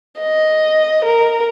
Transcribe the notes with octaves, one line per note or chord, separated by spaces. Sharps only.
D#5
A#4